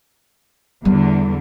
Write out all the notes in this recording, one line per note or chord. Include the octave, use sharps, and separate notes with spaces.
E2 D3 G3